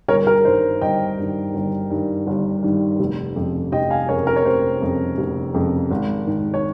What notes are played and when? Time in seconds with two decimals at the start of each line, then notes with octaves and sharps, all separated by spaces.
0.08 G1 A#4 C#5
0.27 A#4
0.45 G2 D#3 C5
0.81 G1 D#5 G5
1.18 G2 D#3
1.54 G1
1.90 G2 D#3
2.27 G1
2.63 G2 D#3
3.00 F1
3.36 F2 C#3
3.72 F1 D#5 G5
3.90 F5 G#5
4.09 F2 C#3 A#4 C#5
4.27 A#4
4.36 C#5
4.45 F1 C5
4.82 F2 C#3
5.18 F1
5.54 F2 C#3
5.91 G#1
6.27 G#2 D#3
6.54 C#5